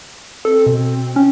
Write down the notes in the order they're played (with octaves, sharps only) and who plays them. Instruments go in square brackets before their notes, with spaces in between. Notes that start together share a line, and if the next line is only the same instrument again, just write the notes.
[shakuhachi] C4 [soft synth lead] A4
[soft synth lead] B2
[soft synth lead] C#4 [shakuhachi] G5